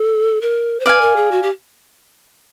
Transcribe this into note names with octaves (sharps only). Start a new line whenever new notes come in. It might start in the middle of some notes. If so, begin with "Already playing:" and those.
Already playing: A4
A#4
C5
B4 D5 F5 G#5
A#4
G#4
F#4
G4